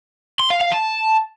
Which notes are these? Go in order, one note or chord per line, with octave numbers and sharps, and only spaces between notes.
C6
F5
F5
A5